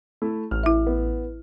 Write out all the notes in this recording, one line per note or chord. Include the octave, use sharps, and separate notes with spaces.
A3 E4
A1 F6
E4 E5
B3